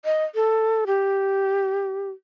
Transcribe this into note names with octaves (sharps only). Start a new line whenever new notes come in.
D#5
A4
G4